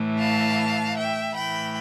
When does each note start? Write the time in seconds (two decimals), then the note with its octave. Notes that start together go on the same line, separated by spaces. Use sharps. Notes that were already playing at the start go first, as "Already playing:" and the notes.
Already playing: A2 E3
0.18 F5 A5
0.96 E5 G5
1.35 A2 E3 G5 B5